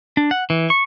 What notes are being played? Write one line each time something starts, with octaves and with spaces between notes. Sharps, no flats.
D4
F#5
E3
C#6